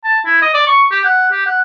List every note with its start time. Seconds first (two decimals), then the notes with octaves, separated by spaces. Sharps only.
0.04 A5
0.26 E4
0.42 D#5
0.54 D5
0.67 C#6
0.91 G4
1.05 F#5
1.32 G4
1.46 F#5